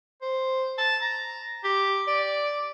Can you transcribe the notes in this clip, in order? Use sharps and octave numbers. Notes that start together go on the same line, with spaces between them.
C5
A5
A#5
G4
D5